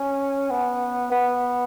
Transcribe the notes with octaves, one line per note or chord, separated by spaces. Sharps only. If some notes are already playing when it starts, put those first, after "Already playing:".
Already playing: C#4
B3
B3